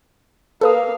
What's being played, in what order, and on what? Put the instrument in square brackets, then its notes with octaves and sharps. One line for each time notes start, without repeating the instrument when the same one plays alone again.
[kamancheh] A#3 F5 [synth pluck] A4 B4 D#6